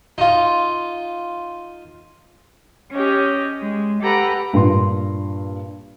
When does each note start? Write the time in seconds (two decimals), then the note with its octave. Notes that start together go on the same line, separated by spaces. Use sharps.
0.18 D#4 F4
2.93 C#4 G4 C#5 D#5
3.62 G#3
4.01 G4 A4 B4 F#5 A#5
4.53 G2 A#2 C6